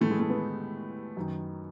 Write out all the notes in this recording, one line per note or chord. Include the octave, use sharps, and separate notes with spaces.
A2 E3 A3
G#3
A3
B3
F#2 D#3